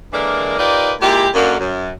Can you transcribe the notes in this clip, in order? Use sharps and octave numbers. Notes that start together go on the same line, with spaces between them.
D3 E3 G#3 A#3 A#4 D5
D#4 F4 G4 A#4 B4 D5
A#2 G#3 E4 G4
F#2 D3 A#3
F#2